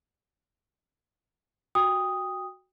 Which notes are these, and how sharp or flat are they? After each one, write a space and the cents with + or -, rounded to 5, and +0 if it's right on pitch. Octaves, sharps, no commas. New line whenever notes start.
F#4 +0 G5 +25 D#6 +0